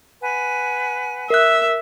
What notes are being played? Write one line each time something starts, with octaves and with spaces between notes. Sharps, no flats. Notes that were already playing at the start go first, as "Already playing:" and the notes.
B4 F#5 G#5
A#4 E5 F#6